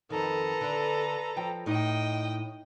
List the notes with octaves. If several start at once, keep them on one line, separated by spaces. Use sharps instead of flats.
F2 D#3 A4 B4 A#5
D3
F3 G5
A2 D#4 D#5 G5